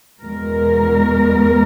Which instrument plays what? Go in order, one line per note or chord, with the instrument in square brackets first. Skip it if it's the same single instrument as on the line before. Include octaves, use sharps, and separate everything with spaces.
[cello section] E2 B2 G#3 A#4